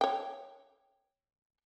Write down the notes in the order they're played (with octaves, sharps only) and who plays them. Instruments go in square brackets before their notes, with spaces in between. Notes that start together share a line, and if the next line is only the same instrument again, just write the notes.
[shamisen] C#5 G5